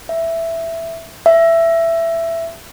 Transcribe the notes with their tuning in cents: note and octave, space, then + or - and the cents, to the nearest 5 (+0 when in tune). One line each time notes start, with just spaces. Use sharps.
E5 +5
E5 +15